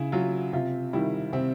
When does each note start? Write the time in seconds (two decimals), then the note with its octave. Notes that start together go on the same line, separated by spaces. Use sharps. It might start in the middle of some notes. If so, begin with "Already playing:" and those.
Already playing: C#3 E4
0.12 F#3 F4
0.53 C3 F4
0.93 D#3 G3 E4
1.33 C3 C4